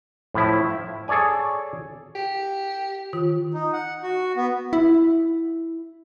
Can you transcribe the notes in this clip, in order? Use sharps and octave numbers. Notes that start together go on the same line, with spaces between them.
A2 F3 E4
E5
G#4 A4 C#5 D5 G#5
G4
D#3 F4
D#4
F#5
F#4
B3
E4